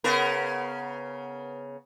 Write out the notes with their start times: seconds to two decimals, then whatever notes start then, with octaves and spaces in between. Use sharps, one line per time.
0.04 C#3 B3 A#4